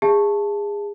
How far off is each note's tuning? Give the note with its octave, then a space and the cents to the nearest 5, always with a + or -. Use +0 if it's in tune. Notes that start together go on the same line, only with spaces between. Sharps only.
G#4 -25 E5 +20 A5 +0